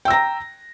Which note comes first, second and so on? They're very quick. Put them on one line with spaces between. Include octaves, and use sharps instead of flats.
G5 E6 A#6 A#5